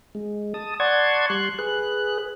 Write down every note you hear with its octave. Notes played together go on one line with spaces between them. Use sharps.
G#3
A5 D#6
D5 F#5 A5 C6 C#6 G#6
G3 C6 F#6
G#4 B4 F#6